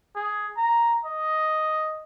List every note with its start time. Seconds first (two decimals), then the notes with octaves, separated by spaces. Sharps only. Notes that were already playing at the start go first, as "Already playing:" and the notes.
0.15 G#4
0.57 A#5
1.05 D#5